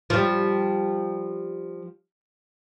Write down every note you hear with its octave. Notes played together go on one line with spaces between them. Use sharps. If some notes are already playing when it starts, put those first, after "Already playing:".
F3 G3